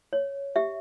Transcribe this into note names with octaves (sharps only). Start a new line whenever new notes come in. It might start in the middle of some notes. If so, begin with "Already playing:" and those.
C#5
G4 E5